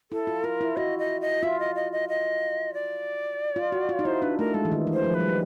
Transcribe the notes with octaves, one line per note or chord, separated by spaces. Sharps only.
E4 A4
F4
F4 A#4
E4
F#4 D#5
D#5
D#5
F4 E5
D#5
D#5
D#5
D#5
D5
F4
F#4
F4
D#4
E4 C5
D4 B4
A3 A#4
G#3 A4
E3
D#3
E3
C5
F3
B4
G3